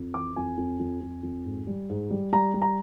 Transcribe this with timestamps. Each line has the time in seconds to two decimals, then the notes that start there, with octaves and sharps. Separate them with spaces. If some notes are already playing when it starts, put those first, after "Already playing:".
Already playing: F2
0.14 E3 D6
0.36 F2 G#5
0.57 F2
0.79 F2
1.01 F2
1.23 F2
1.45 G#2
1.67 G3
1.89 G#2
2.10 G3
2.33 G3 A#5
2.54 G3
2.62 A#5